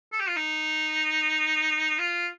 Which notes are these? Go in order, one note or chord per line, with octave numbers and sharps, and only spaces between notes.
A4
G4
F4
D#4
F4